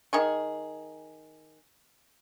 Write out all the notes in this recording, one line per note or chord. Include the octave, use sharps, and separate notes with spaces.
D#3 G#4 C#6